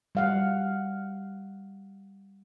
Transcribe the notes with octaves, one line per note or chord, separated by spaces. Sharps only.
G3 F5 F#5